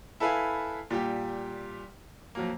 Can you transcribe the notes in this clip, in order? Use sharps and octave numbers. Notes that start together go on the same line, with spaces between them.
E4 A4 B4 F5 G#5
A#2 G3 G4
F2 F#3 A#3